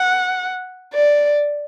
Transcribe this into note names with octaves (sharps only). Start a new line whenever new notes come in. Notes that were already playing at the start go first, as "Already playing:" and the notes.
Already playing: F#5
D5